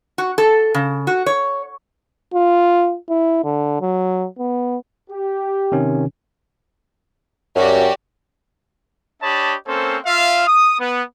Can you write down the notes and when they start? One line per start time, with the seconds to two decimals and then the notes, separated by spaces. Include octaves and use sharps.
0.18 F#4
0.38 A4
0.75 C#3
1.07 F#4
1.26 C#5
2.34 F4
3.09 E4
3.44 D3
3.81 F#3
4.38 B3
5.10 G4
5.72 C3 D#3 C#4
7.55 F#2 F#4 G4 D5
9.22 D4 G4 C#5 D#5 A5 B5
9.67 A#3 C4 C#4 A4 C5
10.06 F4 E5 F5
10.47 D#6
10.79 B3